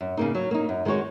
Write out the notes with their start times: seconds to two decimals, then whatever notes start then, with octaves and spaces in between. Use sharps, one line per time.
0.01 F#2
0.17 C#3 A#3 D#4
0.35 F#3
0.51 A#3 D#4
0.69 F#2
0.85 D#3 G#3 F#4 C#5